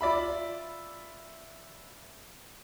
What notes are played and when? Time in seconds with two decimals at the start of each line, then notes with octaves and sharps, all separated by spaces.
0.01 F4 D5 E5 B5